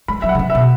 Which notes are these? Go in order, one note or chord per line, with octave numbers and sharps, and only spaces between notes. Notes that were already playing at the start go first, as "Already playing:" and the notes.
G#3 B5
F#3 E5
F#5
C#3
E3
E5
B2